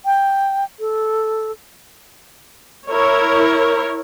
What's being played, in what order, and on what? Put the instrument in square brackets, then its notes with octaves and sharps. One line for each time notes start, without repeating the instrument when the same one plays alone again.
[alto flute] G5
A4
[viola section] E4 A#4 C#5